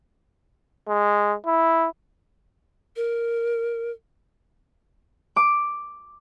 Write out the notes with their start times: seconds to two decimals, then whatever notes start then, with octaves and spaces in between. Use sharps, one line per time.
0.88 G#3
1.46 E4
2.96 A#4
5.36 D6